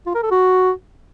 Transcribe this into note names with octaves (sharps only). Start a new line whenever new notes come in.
F4
A#4
A4
F#4